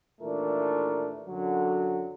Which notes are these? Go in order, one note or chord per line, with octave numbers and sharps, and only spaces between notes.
D#2 A#2 E3 A3 D4 A#4
F#2 D3 F#3